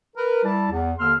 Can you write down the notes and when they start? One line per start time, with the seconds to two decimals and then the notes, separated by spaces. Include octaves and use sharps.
0.16 A#4 B4
0.44 G3 E4 A5
0.70 E2
0.98 D#2 D3 A#3 C6 E6 F6